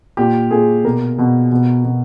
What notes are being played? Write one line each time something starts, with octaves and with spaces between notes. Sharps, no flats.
A#2 G4
A#2 G#4
B2 A#4
B2
B2
B2